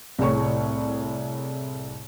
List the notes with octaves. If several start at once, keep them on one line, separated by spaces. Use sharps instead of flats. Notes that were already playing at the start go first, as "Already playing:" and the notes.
C2 A2 G#4 C#5 C#6